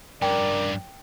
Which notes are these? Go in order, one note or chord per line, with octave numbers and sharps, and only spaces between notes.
G2 C#4 A#4 D5 G5